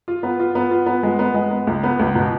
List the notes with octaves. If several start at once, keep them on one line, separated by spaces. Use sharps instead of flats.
F4
B3
F4
B3
F4
B3
G#3
B3
G#3
B3
C#2
B3
C#2
B2